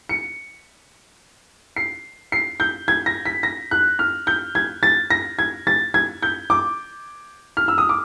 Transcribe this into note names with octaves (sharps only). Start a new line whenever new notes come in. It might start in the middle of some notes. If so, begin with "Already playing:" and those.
C#7
C7
C7
G6
G#6
A#6
B6
A#6
F#6
F6
G6
G#6
A6
A#6
G#6
A6
G#6
G6
D6
F6
E6
D#6
D6